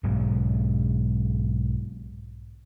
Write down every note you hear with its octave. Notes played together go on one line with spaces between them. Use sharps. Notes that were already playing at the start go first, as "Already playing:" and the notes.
B1 G#2 F#3